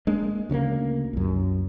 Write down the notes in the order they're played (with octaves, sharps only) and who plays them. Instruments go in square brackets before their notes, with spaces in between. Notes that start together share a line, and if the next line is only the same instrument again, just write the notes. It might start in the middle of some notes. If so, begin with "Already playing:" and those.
[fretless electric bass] G#3 A#3 D4
D2 C#3 A3 A#3
C2 F#2